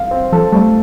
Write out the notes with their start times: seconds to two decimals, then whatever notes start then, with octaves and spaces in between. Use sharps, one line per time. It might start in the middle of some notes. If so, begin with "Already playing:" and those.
Already playing: F5
0.11 C4
0.32 F3 A4
0.52 G3 A3